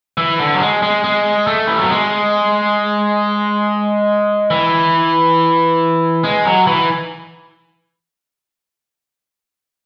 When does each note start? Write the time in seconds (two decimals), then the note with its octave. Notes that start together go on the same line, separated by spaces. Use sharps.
0.17 E3
0.39 D3
0.55 F#3
0.61 G#3
0.82 G#3
1.04 G#3
1.47 A3
1.67 E3
1.79 F#3
1.91 G#3
4.51 E3
6.24 G#3
6.45 F#3
6.67 E3